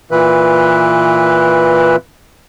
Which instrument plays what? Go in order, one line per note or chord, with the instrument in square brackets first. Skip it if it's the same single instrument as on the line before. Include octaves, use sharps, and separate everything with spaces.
[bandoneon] A#2 E3 B4